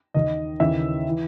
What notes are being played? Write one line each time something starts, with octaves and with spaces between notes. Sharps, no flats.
D#2 D#3 D#5
D#2 C#3 E3 E5
E3